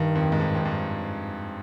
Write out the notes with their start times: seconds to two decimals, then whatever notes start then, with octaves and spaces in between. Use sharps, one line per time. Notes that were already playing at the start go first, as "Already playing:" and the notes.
Already playing: G2 D#3
0.15 F2
0.32 G#2
0.40 G2
0.55 F2
0.65 G2